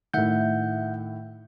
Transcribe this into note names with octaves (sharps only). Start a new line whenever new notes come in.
A2 D#3 E5 F#5 G6